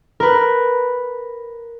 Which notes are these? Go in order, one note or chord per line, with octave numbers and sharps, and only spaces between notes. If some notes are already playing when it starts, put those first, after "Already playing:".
A#4 B4